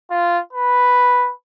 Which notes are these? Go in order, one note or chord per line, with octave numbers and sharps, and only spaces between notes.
F4
B4